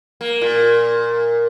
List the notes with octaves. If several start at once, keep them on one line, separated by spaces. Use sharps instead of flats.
A#3
A#2